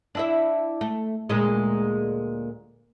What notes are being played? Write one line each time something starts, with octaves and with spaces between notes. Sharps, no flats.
D4 E4 E5
A3
D2 A#2 G#3